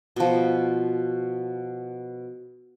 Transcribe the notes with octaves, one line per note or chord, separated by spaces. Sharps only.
B2 F3